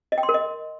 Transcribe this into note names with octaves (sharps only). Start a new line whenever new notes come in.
D#5
G5
C6
A#4
D#5